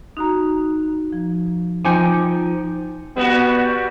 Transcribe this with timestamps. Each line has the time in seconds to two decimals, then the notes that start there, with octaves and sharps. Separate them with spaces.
0.17 D#4 F#4 A#5
1.13 F3
1.85 F3 D#4 G5 G#5 D6
3.16 G3 B3 F#4